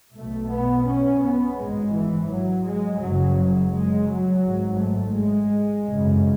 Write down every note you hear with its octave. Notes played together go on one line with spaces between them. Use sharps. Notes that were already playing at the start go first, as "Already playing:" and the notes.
B1 B2 A3
B3
C#4
B3
G#1 G#2 G#3
E3
F#3
G#3
F#1 F#2 C#3 F#3
F#3
G#3
F#3
G#1 G#2
A3
G#3
G#1 F#2 C#3